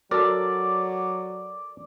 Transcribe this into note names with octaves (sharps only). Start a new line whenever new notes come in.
F#3 F#4 A4 A#4 D5